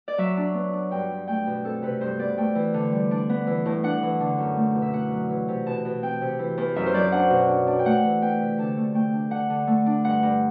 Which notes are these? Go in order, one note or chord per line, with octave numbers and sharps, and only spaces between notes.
D5
F#3 E5
D4
B3
D4
G2 G5
G2
A3 G5
B2
C4 A4
C3 B4
G2 C5
B3 D5
A3 G5
E3
D3
G3
D4
B3
E3
A2
D4 F#5
E3
D3
F#2
A3
B2
E5
B3 F#5
F#3
E3
C3
B2 A5
B2
C4 G5
C3
E3
E2
F#2 E5
C5
F#3 D5
D4 F#5
B2
D4
D4
G5
A3 F#5
E3
B3 G5
C3
D3 A5
A3
A3 G5
D4
D3 F#5
D3
A3
D4
G2 F#5
G2